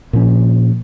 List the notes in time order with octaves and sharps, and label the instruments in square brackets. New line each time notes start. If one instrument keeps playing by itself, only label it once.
[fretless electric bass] A#2 F3 C#4